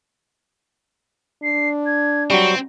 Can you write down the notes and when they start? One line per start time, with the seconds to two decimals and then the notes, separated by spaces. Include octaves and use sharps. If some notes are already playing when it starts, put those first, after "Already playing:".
1.43 D4 C7
1.86 G#6
2.30 F#3 G3 C4 C#6